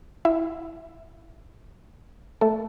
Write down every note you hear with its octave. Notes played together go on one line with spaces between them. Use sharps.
E4 E5
A3 A4